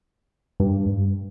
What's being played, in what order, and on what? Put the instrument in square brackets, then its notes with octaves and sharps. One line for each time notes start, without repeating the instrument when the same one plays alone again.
[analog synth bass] G2